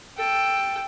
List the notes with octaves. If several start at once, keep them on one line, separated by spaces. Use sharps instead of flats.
A4 G5